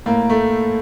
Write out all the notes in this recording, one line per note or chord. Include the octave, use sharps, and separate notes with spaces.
A2 A#3
A3